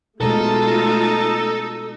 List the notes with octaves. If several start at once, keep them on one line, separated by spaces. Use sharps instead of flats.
B2 G#3 A3 D#4 F4 A4